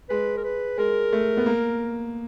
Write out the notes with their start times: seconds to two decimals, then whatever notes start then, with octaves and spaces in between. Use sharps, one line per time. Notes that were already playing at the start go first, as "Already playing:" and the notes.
0.09 G#3 B4
0.37 A#4
0.44 B4
0.78 G#3 A#4
1.12 A3
1.37 B3
1.46 A#3